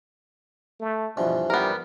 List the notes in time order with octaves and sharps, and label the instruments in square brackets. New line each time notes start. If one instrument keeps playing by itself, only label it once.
[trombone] A3
[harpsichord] G2 E3 F3 [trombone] B2
[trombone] G3 [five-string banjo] B3 A#4